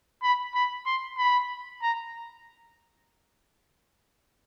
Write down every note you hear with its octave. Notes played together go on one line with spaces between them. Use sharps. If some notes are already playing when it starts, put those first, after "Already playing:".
B5
B5
C6
B5
A#5